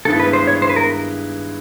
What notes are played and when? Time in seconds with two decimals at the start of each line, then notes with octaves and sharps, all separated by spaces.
0.05 G2 D#3 G#3 B3 E4 A4
0.20 B4
0.33 C5
0.47 C#5
0.62 C5
0.70 B4
0.76 A#4